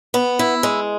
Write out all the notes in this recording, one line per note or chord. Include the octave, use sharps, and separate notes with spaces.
B3
E4
G#3